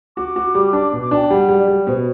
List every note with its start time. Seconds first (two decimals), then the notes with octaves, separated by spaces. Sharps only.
0.16 F#4 D6
0.36 F#4
0.55 G3
0.73 D4 D6
0.92 B2
1.01 D6
1.11 D4 A5
1.15 G5
1.30 G3 F#5
1.49 G3
1.59 D5
1.67 G3
1.87 B2 C5